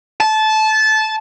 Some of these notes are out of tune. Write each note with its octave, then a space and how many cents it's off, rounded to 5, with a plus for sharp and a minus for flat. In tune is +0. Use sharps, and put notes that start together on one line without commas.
A5 -20